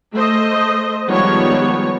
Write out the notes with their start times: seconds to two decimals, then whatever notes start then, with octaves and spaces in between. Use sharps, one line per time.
0.12 A3 C5 D#5
1.08 D#3 F3 G3 G#3 B3 C#5